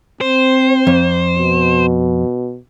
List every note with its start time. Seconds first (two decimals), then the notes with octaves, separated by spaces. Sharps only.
0.21 C4 C5
0.87 F2
1.39 B2